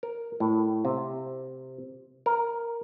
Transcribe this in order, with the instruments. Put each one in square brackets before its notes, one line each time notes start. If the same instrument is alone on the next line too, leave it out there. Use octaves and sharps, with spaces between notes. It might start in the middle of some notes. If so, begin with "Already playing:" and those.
[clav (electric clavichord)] A#4
A2
C3
A#4